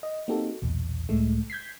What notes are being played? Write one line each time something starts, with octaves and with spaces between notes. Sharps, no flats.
D#5
A#3 C4 D#4 F#4 G4 A4
B1 E2 A#2
C#2 A2 G#3 A3
G6 G#6 B6 C7